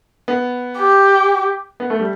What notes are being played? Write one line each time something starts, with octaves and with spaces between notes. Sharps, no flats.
B3
G4
B3
A3
G3